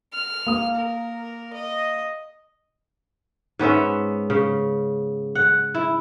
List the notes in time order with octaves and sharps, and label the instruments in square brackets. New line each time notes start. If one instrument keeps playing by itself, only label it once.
[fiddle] F6
[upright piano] A#3 D#6
[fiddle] A#4
D#5
[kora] G#2 B3 C#4 E5
C#3
F#5
E4